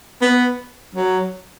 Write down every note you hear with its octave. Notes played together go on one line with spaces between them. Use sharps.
B3
F#3